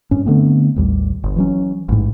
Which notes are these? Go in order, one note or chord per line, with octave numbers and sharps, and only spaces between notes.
G2 C#4
D3 A3 B3 C4
A1 D#2 G3
G1
E3 F#3 C#4
A1 G#2